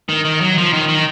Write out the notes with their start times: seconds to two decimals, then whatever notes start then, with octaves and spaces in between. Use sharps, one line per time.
0.09 D#3
0.25 D#3
0.41 F#3
0.58 F3
0.73 D#3
0.89 D#3